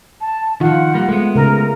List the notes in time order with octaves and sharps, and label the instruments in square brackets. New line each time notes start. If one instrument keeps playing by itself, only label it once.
[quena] A5
[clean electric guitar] D#3 F3 [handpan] F4 [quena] F#5
[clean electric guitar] G3 A#3
[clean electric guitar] G#3 B3 [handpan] A3
[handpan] C#3 [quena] A#4